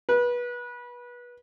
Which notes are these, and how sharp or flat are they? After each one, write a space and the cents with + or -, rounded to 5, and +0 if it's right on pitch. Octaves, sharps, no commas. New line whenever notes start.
B4 -25